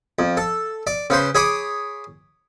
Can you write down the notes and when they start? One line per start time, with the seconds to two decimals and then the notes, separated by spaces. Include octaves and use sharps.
0.19 F2
0.37 A4
0.87 D5
1.10 C#3 B4 C5 C6
1.35 G#4 C#5 B5 D6 D#6